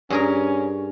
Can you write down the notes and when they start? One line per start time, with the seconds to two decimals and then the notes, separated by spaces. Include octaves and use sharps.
0.10 G2 C#4 G#4 A#4